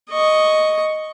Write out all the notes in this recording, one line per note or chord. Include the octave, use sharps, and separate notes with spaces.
D#5 C#6